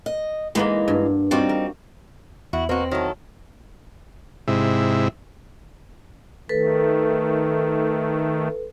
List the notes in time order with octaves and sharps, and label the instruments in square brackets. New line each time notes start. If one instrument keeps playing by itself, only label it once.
[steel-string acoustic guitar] D#5
[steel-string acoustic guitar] E3 G#3 D#4 [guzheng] A#3 B3 B5
[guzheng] G2
[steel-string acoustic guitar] G3 C4 D#4 [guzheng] F4 F#4 D5
[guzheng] A#4
[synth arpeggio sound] E2 [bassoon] E4 [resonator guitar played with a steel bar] F#4
[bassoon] B2 [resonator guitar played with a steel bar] A#3 F#4 [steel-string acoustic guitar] C4
[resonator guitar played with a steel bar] D#3 E4 A4 [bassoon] F#3
[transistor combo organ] G#2 C3 E4
[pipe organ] D#3 A3 [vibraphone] A4 B4